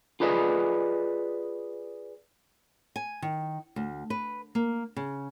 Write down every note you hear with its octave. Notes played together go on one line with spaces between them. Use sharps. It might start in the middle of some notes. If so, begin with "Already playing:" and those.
F4 G#4 B4 D5 D#5
G#5
D#3
D2
B4
A#3
C#3